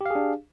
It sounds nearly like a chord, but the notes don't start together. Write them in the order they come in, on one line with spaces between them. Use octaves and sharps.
G4 F5 G#4 D4